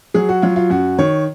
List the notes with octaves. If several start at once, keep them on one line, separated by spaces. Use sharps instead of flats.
F#3 G#4
F#4
F#3 F4
F4
F#2 F#4
D#3 C#5